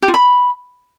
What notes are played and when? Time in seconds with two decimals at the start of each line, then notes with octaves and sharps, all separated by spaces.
0.02 G4
0.08 F4
0.14 B5